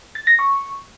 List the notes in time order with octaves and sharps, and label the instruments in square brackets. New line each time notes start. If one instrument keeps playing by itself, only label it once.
[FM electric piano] A6
A#6
C#6